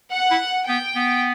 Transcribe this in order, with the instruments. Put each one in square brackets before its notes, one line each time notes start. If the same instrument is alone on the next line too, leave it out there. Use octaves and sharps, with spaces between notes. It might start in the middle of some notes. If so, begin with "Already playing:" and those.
[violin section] F#5
[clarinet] E4
[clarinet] B3 [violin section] G5
[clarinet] B3